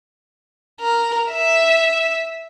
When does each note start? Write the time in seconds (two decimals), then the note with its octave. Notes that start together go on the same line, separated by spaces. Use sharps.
0.80 A#4
1.31 E5